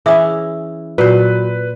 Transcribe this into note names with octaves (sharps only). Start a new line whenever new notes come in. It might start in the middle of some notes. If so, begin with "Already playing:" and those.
E3 C#4 E4 G#4 E5 D#6
A#2 F#3 B4 C5